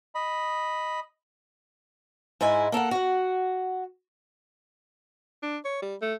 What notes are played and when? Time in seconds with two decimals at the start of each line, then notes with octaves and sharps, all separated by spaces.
0.15 D#5 B5
2.41 G#2 G#3 E4 G#5
2.72 A#3 A4 A#4 F#5
2.91 F#4 F#5
5.43 D4
5.65 C#5
5.82 G3
6.02 A3